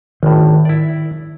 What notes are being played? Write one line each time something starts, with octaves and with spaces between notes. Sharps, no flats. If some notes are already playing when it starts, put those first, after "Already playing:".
G#1 A2 D#3
E4 D5